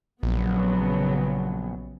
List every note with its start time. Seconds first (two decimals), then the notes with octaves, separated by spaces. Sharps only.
0.23 A#1 C#3 F#3 B3